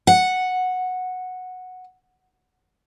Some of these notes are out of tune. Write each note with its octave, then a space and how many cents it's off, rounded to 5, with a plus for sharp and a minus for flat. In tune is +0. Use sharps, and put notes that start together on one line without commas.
F#5 -5